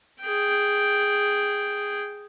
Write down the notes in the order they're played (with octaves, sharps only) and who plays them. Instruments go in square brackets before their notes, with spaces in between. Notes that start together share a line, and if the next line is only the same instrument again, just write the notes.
[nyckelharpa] G#4 G5